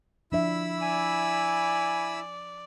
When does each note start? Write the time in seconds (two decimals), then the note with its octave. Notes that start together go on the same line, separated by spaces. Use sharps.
0.32 F3 D4 E4 E5 B5 E6
0.82 D5 G#5